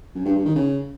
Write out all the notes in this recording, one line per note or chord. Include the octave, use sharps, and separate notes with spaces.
F#2
G2
G2
D#3
C#3